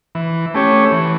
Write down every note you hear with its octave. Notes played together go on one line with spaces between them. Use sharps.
E3
A3 C#4 G4 C#5
E3